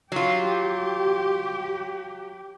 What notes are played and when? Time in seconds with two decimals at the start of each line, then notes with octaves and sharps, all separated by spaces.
0.12 F#3 F4 G4